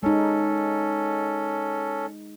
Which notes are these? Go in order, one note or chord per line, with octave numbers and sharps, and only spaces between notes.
G#3 C#4 D#4 A4